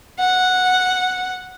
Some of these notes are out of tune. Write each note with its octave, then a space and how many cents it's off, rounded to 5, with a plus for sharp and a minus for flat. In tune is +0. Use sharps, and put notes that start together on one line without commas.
F#5 -10